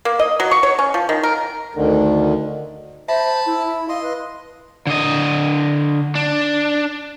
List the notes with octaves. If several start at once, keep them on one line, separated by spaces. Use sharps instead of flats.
A#3
D#5
F#3
C#6
C#5
C#4
F3
D#3
A#4
D2 D3 D#3
C5 E5 A5 B5
E4
D#5 F5 C6
B4
D3 D#5
D4